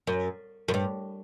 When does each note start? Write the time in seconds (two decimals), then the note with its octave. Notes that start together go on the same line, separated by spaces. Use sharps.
0.07 F#2
0.68 F#2
0.74 G2